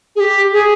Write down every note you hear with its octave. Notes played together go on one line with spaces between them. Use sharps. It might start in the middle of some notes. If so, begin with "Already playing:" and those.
G#4
G4
G#4